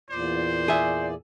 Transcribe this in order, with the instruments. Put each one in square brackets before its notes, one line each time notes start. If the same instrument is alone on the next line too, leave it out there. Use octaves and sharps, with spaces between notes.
[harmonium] E2 A#2 D5 [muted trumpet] C5
[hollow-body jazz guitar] G#4 E5